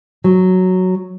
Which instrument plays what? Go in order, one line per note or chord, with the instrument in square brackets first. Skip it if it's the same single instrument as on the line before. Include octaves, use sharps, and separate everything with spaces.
[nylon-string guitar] F#3